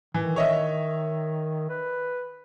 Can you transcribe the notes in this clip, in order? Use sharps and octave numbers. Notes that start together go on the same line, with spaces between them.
D#3 E3
C#5 D#5 E5
B4